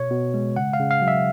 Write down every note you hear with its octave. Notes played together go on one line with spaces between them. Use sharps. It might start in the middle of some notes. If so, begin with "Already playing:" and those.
Already playing: B2 C#5
B2
G#3
C#3 F#5
F5
C#3
F5
F#3
E5